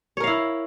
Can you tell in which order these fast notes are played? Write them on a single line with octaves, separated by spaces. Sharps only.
C#5 A#4 F5 E4